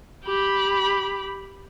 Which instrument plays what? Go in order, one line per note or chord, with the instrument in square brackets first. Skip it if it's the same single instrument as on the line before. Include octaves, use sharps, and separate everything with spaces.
[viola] G4 B5